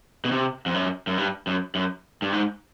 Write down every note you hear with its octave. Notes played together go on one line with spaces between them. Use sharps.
B2
C3
F2
F#2
F#2
G2
F#2
F#2
G2
G#2